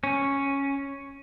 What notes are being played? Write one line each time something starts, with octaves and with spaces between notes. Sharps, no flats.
C#4